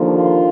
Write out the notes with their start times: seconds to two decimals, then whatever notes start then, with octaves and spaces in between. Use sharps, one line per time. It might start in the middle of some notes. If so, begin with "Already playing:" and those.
Already playing: D#2 D3 F3 A#3
0.15 F4